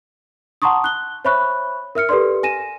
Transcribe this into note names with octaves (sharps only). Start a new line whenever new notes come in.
F#5 A5 A#5 C6 C#6 D#6
F#6 G7
C5 C#5 E5 B5 C#6 F#6
A#4 E5 F6 C#7
G4 A4 B4 D5 C6
G#5 A#6 D#7 E7